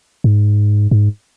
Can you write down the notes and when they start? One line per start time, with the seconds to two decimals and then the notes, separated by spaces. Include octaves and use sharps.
0.24 G#2
0.91 G#2